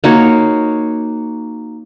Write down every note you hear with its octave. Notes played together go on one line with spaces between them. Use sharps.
A#3 D#4 F#4 C#5